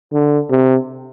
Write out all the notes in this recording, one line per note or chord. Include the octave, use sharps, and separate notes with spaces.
D3
C3